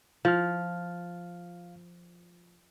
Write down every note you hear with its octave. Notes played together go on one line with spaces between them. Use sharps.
F3 F5 F6